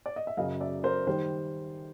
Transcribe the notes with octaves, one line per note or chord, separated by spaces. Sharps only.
D5
D#5
E5
F#2 C#3 F#3 D#5 F5
D5 E5
A#4 C5
D#3 G3 C5